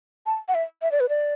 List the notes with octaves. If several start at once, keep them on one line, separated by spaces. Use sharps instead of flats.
A5
F#5
E5
E5
D5
B4
D5